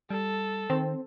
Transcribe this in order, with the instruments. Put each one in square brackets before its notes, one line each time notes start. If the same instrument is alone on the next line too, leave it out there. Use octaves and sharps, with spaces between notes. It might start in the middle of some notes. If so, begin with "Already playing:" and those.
[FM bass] G3 [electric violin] A4
[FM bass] D#3 [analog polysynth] C4